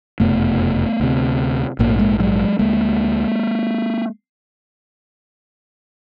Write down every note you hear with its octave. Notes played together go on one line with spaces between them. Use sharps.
F#1 F2 C3 A3 B3
D2 C3
A#1 G#2 A#3
A3
G#3 A#3
F#3 G#3
D2 D3 G#3 A#3